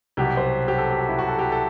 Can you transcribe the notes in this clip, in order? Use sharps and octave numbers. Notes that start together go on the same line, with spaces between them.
C2 B2 F#3 G4
C5
G4
A4
G4
F#4
E4
F#4
A4
G4
A4